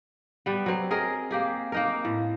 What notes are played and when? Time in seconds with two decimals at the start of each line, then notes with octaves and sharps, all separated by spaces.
0.46 G3 B3
0.66 F#3 C4
0.91 G#4 A#4 D#5
1.31 A#3 G4 G#4
1.72 A#3 D#4 A#4
2.05 A2